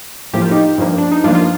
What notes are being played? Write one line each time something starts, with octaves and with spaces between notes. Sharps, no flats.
A2 F3 A#3 G4
F4
D#4 G4
G2 F3 A#3
D4
D#4
G2 F3 A#3 D4 F4
F4